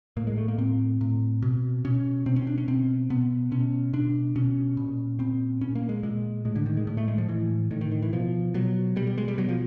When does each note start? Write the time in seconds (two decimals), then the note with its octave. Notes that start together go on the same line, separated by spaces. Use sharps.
0.17 A2 A#3
0.27 G#3
0.38 A3
0.48 A#3
0.58 A2 C4
1.01 A2
1.42 B2
1.85 B2 C#4
2.26 B2 C4
2.36 C#4
2.47 D4
2.58 C#4
2.68 B2 C4
3.10 B2 B3
3.52 B2 C#4
3.93 B2 D4
4.36 B2 C#4
4.77 A#2
5.19 A#2 C4
5.61 A#2 C#4
5.75 A#3
5.89 G#3
6.03 A#2 G#3
6.45 A2 G#3
6.56 D3
6.66 D#3
6.77 G#3
6.87 A2
6.97 A3
7.08 G#3
7.18 F3
7.28 A2 E3
7.71 A2 D#3
7.81 D#3
7.91 D#3
8.02 E3
8.13 B2 F3
8.54 B2 F#3
8.96 B2 G3
9.07 G3
9.18 G#3
9.28 G3
9.38 B2 F#3
9.49 F3